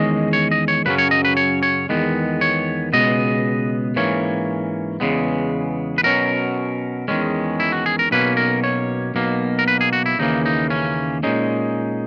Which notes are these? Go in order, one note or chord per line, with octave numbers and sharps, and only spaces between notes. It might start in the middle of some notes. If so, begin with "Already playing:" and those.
Already playing: E2 D#3 G#3 C#4 D#5
C#5
D#5
C#5
F#2 C#3 F#3 C#4 B4
C#5
D#5
B4
C#5
C#5
E2 D#3 G#3 B3
C#5
C#2 B2 G#3 B3 D#5
G#2 E3 A#3 C#4 C#5
E2 C#3 G#3 B3
B4
B2 F#3 C#4 A#4
E2 D#3 G#3 C#4
E4
F#4
G#4
A#4
B1 B2 A#3 C#4 B4
A#4
C#5
B1 B2 A#3
A#4
B4
G#4
F#4
E4
D#2 C#3 E3 A#3 D#4
D#4
C#4
A#2 G#3 C#4 D#4